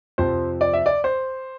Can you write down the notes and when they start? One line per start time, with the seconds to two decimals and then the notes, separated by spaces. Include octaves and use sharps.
0.18 F2 C3 F3 C4 C5
0.61 D5
0.73 E5
0.86 D5
1.04 C5